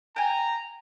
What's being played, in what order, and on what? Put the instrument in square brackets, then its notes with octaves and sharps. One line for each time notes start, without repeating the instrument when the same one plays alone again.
[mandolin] G5 G#5 [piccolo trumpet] A#5